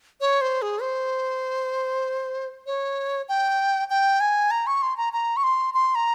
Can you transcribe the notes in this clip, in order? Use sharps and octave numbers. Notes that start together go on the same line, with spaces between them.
C#5
C5
G#4
C5
C#5
G5
G5
G#5
A#5
C#6
C6
A#5
A#5
C#6
C6
C6
A#5